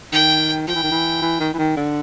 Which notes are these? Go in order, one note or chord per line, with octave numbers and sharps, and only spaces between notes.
D#3 G5
F3 G5
E3
D#3
E3
E3
D#3
E3
D#3
D3